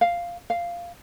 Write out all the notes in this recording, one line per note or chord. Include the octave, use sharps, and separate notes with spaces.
F5
F5